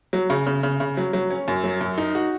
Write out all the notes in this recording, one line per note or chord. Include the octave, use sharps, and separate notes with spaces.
F#3
C#3
C#3
C#3
C#3
F#3
F#3
C#4
F#2
F#3
F#2
D#4
F#4